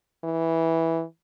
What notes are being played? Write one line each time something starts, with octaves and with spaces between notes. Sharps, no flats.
E3